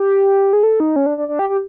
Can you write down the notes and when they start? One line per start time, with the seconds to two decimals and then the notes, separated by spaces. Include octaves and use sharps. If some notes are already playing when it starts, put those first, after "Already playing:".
Already playing: G4
0.53 G#4
0.63 A4
0.80 D#4
0.96 C#4
1.06 D4
1.18 D4
1.28 D4
1.39 G4
1.49 G4